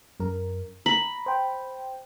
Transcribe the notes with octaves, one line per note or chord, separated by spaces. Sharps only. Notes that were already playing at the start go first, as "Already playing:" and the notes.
F#2 A#4
A#5 B5
C5 G5